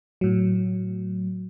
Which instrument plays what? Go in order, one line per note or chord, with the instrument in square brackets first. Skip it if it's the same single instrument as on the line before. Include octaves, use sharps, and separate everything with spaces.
[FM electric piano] A2 F#3